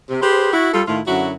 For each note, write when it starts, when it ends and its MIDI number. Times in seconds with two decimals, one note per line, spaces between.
0.10 0.18 48
0.22 0.52 67
0.22 0.52 68
0.22 0.52 71
0.22 0.52 72
0.52 0.69 64
0.52 0.69 66
0.73 0.82 55
0.73 0.82 65
0.73 0.82 69
0.87 1.00 45
0.87 1.00 51
0.87 1.00 64
0.87 1.00 65
1.07 1.33 42
1.07 1.33 50
1.07 1.33 54
1.07 1.33 64
1.07 1.33 66